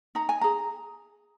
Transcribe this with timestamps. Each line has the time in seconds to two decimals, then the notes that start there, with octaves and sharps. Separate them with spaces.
0.15 D#4 A#5
0.29 G#5
0.41 G#4 A#5